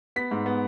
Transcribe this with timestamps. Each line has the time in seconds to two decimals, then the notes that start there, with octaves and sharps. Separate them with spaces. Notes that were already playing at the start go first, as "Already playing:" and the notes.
0.16 B3 B6
0.31 G#2
0.46 B3